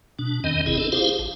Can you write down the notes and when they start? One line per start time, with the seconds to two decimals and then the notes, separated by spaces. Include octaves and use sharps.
0.19 B2 D4
0.44 E2 D#3 C4 D#5
0.66 G1 C3 E4 G#4 D#5
0.78 C4 D4 A4
0.92 E4 F4 G4 G#4 C5 F5
1.19 A1